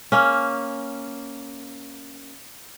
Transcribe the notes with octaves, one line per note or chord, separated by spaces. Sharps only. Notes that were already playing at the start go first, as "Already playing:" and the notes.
A#3 C#4